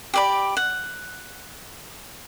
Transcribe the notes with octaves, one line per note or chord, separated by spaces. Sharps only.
G4 D5 B5
F#5